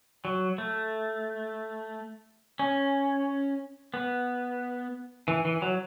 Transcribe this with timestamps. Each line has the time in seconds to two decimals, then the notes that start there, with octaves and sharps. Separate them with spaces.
0.25 F#3
0.58 A3
2.59 C#4
3.94 B3
5.28 E3
5.45 E3
5.62 F#3